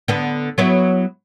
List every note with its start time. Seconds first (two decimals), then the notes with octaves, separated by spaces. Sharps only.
0.08 D3 B3
0.58 F#3 B3 E4